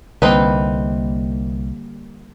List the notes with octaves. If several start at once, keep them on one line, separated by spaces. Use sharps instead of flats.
C2 D3 G3 A#3 C4 D#4 B4